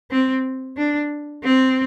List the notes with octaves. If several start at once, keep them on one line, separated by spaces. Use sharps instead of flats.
C4
D4
C4